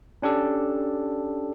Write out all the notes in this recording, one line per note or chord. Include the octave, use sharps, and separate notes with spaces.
C#4 D4 G4 A4